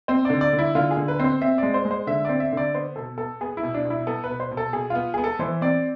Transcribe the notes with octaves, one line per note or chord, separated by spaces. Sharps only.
C4 C5
D3 D5
D5
D3
E4
D3 F4
G#4
D3
B4
C4 C5
C4 E5
G#3 D5
C5
G#3
C5
D3 E5
C4 D5
E5
D3 D5
B3 C5
B2 A4
B3 A4
B3 G#4
E4
B2
D4
B2
E4
B3 A4
B4
B2
C5
B2
A4
B2 G#4
B3 F4
G#4
B3
A4
E3 C5
C4 D5